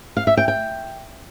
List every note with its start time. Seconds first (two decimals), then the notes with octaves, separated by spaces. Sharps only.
0.17 F5
0.27 E5
0.37 G5
0.48 G5